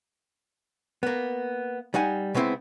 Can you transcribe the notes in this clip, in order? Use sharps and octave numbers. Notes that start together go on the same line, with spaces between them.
A#3 B3
G3 D#4 F#5 G#5
C#3 G#3 B3 C4 E4